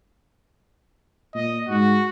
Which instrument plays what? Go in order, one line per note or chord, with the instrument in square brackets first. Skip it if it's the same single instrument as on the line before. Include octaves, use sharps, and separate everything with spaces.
[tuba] A#2 [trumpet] D#5
[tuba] G#2 [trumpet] F#4